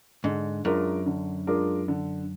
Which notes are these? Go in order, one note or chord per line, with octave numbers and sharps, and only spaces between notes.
G#2 D3
F#2 G#3 D4 F4 A#4
D3
G#3 D4 F4 A#4
D3